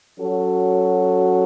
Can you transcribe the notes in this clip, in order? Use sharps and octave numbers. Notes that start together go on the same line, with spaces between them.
F#3 C#4 F#4 A4